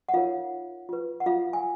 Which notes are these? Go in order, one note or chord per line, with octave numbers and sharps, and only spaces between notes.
F#5
D#4 F4 A#4 C#5 F5
F4 B4
F#5
F4 F5
G#5